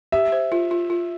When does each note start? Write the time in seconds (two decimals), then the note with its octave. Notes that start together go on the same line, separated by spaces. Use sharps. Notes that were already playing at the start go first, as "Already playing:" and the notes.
0.12 G4 E5
0.32 C5
0.52 F4
0.71 F4
0.90 F4